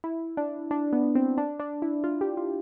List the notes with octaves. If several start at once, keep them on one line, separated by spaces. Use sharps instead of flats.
E4
D4
D4
B3
C4
D4
D4
E4
F4
G4
F4